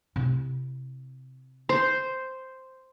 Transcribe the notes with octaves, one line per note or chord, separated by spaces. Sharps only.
C3 E4
C5